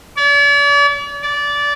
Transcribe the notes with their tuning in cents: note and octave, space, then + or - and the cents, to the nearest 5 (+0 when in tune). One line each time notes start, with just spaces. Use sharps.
D5 -45
D5 -20